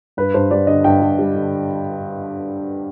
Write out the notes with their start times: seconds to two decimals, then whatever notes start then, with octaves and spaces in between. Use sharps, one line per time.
0.17 G2 B4
0.34 G2 C5
0.51 G3 D5
0.67 D3 D#5
0.84 G2 G5
1.02 G2
1.19 G3
1.35 D3